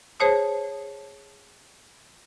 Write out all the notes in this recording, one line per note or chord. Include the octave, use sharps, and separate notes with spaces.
G#4 C5 C#5 A5 D#6